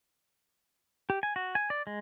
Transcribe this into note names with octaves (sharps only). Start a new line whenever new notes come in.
G4
G#5
F#4
G#5
D5
G#3